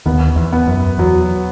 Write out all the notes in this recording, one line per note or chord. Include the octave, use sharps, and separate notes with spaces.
D#2 D#3 B3
E2
B3
F#2
E2 F#3